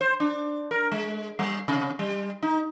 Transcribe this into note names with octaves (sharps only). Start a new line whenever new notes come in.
C5
D4
A#4
G#3
G3
C3
G3
D#4